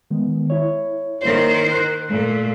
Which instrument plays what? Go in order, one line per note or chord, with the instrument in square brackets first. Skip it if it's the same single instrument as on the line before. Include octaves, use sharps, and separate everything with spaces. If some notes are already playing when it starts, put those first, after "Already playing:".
[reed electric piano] D#3 G#3 B3
E4 C#5
[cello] D#3 C5 [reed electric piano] A#3 E4 C#5
[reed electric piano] F#6
[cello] A#2 A3